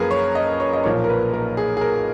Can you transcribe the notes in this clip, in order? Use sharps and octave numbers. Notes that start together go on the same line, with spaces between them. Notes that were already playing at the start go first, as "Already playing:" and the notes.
Already playing: F#2 F3 A#3 G#4 A#4 B4
C#5
D#5
C#5
D#5
B1 A#2 F3 A#3 C#5
A#4
B4
A#4
G#4
G#4
A#4